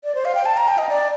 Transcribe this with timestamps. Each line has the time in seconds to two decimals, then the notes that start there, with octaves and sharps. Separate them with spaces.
0.04 D5
0.15 C5
0.25 F5
0.35 G5
0.46 A5
0.57 A#5
0.68 G5
0.78 D#5
0.89 D5